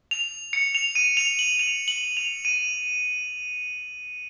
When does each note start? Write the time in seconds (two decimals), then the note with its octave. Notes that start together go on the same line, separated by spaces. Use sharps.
0.11 F7
0.53 C#7
0.75 F7
0.95 D#7
1.17 F7
1.39 F#7
1.59 F7
1.88 F#7
2.17 F7
2.45 D#7